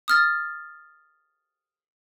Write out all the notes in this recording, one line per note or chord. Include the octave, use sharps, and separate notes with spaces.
D#6 F6 A6